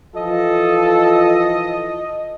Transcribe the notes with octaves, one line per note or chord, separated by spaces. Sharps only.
E3 F3 F4 A4 D#5